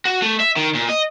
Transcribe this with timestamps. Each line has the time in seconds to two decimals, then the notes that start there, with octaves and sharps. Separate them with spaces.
0.05 F#4
0.22 A3
0.40 E5
0.56 D#3
0.74 A#2
0.89 D#5